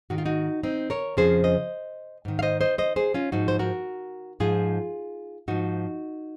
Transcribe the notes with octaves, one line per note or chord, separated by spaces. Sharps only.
G#2 D#3 F#4
F4
D#4 F#4
C4 D#4
A#4 C#5
F2 C#3 F3 G#4 C5
C5 D#5
G#2 D#3
F5
C5 D#5
C5 D#5
C5 D#5
G#4 C5
C#4 F4
G#2 F3 D#4 F#4
C5
F#4 A#4
G#2 F3 F4 G#4
G#2 F3 D#4 F#4